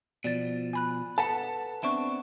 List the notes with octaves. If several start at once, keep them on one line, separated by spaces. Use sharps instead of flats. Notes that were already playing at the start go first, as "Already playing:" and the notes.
B2 F3 D5 A6
G#5 B5 F#6
A4 B4 F#5 A5
B3 C4 D4 E5 C#6